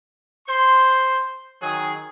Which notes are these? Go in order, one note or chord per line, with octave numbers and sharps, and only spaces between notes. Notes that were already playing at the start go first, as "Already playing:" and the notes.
C5 C6
D#3 F#3 G#4